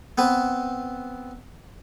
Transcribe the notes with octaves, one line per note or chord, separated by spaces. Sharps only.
B3 C4 B4